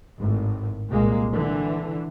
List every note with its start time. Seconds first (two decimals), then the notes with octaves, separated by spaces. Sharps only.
0.19 G#1 A2
0.89 C2 A#2 G#3 A#3
1.31 D3 E3